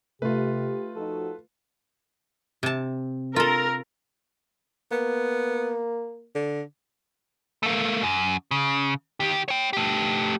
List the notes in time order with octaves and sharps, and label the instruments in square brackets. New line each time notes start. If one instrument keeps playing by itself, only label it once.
[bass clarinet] C3 [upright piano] A3 [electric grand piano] F4 B4 [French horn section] G4
[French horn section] F3 D#4 F#4 [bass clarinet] A4
[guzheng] C3 A5
[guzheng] F4 A4 [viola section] A#4
[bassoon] A#3 [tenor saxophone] B3
[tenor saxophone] D3
[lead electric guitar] A3 A#3
F#2
C#3
D#3 G4
C#5 G5
A3 G4